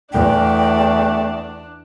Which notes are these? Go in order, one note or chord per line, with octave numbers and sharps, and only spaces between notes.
E2 A3 D4 G5